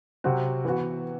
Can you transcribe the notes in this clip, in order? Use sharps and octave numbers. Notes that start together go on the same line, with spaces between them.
C3 F#3 C4 F#4
E3 B3 F#4